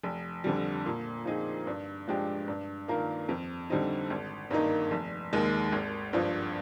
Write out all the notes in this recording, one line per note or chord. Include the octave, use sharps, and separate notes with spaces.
F1
F2 D3 G3
A#2
F3 C4 D#4 G#4
G2
F3 G#3 D4 G4
G2
D#3 A#3 F4 A#4
F2
D3 G3 C4 D#4
G#1
G2 D#3 A#3 D#4
F1
D#2 D#3 G#3
G#1
G2 F3